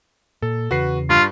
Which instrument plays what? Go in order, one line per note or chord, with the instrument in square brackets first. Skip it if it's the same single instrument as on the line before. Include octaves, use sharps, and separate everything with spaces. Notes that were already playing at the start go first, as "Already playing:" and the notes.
[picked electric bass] A#2 [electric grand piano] A4
[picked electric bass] E2 C#3 [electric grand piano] F#4 B4 C7
[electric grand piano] G2 [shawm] F4